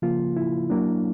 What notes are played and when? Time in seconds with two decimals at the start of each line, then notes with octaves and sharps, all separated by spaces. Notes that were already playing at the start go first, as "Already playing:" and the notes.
0.02 C#3 F3 A#3 F4
0.37 E4
0.70 F#3 A#3 D4